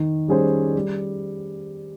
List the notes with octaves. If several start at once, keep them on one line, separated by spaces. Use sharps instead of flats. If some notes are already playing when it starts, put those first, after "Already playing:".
Already playing: D#3
G3 C#4 G#4 C5
G3